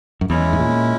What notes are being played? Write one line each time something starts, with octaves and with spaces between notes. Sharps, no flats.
F#2
E2 G#3 C#4 E4
G#2
A#2